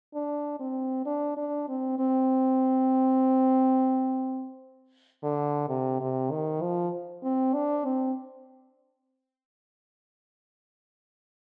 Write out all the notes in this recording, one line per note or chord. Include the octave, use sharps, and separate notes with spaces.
D4
C4
D4
D4
C4
C4
D3
C3
C3
D#3
F3
C4
D4
C4